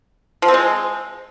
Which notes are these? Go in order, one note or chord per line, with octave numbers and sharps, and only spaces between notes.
F3
C4
G#3